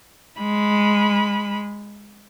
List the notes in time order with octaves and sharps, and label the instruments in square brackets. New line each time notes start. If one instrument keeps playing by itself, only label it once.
[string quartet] G#3 B5